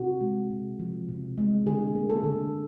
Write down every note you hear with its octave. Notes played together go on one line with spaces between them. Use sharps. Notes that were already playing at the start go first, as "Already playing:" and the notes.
Already playing: C3 F#4
G#3
C3
F3
C3
G#3
D3 G#4
A#3
A4
D3